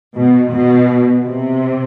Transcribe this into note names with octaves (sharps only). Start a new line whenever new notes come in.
B2
B2
C3